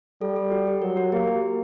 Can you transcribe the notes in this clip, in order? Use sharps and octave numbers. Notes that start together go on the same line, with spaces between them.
G3 A4
A4
F#4
G4
F#3 A#4
F#4
A#3 G4
G4